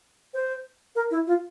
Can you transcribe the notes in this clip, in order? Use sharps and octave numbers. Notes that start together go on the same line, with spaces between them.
C5
A#4
E4
F4